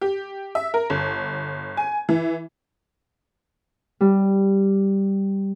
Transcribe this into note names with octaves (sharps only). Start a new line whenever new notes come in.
G4
E5
A#4
G1
G#5
E3
G3